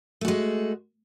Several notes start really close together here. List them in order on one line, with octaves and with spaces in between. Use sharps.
A3 F#4 G#3